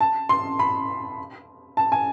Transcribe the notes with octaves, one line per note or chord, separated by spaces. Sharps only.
A5
C6
B5
A5
G#5